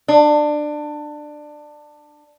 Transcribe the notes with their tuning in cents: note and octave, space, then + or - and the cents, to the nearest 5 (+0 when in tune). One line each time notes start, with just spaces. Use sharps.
D4 +20